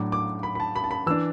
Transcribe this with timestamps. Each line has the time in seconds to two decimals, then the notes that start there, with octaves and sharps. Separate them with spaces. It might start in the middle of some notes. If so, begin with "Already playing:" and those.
Already playing: A2 F#3 D4 D6
0.12 D6
0.43 B5
0.55 B5
0.60 A5
0.76 B5
0.84 A5
0.91 B5
1.06 E3 D4 E6